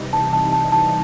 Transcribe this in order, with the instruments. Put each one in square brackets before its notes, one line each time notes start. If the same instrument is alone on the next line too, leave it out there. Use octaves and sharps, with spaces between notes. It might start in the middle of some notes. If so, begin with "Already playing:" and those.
Already playing: [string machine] C3 E3 G3 D#4
[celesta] A5
A5
A5
A5